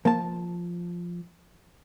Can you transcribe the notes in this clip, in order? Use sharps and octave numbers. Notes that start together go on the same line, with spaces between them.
F3 A#3 A5